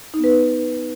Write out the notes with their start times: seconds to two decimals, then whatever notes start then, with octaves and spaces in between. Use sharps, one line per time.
0.14 D#4
0.19 B3
0.24 B4